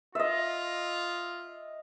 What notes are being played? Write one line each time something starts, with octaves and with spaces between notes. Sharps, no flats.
F4 D#5 E5